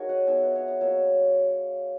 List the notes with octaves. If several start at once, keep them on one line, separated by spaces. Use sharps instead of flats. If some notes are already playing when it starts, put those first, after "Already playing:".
Already playing: G#3 D#4 F#4 G#4 A#4 C#5
D#5 F#5
G#3 B3 D#4 E5 G#5
B4
C#5
D#5
F#3 A#3 C#4 C#5 E5